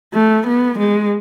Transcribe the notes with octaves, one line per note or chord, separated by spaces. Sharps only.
A3
B3
G#3